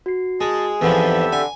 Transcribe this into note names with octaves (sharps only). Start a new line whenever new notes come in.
F#4 C7
G#3 G#4 D#5 A5
E2 G#2 F3 C4 G4 A4 E5 B5
D3 G#5